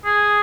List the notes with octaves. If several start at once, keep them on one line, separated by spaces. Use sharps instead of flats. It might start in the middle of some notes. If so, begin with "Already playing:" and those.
G#4